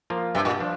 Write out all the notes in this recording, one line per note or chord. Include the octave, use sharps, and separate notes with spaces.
F3 A#3 F4
G2 C3
A#2
F3 D4